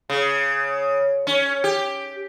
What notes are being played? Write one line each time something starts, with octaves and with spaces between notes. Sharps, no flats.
C#3
C#4
G4